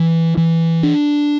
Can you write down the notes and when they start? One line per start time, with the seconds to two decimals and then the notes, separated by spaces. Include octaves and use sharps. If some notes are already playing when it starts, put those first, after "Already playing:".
Already playing: E3
0.37 E3
0.83 D4